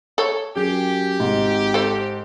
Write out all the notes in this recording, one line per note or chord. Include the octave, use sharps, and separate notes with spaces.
A4 C#5
F#2 G4 G#4
G#1 G#2
A4 C5